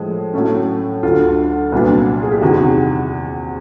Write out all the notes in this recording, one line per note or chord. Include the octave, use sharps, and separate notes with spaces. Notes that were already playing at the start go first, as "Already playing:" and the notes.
Already playing: A2 F3 G#3
A2 F#3 A3 C#4
D2 D3 F#3 F4
C2 A#2 F#3 B3 D4
G#4
G4
E2 C3 D#3 F#4